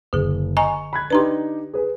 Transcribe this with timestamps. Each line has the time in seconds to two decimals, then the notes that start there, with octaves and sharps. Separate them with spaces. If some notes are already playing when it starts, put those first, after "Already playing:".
0.13 F#1 D3 G#4
0.57 D#5 G#5 A#5 C#6
0.93 B5 F#6 G#6
1.10 D4 D#4 G4 B4 A#5 C6
1.74 G#4 B4